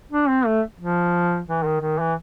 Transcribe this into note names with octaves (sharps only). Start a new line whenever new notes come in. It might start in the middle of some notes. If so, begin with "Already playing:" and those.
D4
C4
A3
F3
E3
D#3
D#3
E3